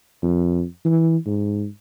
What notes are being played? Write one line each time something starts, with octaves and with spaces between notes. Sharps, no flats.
F2
E3
G#2